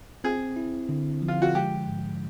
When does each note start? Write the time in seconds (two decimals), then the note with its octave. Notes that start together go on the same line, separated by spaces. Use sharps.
0.24 C4 G#4
0.56 E4
0.89 D3
1.22 F3
1.28 F4
1.42 F#4
1.55 G#3 G4
1.88 G#2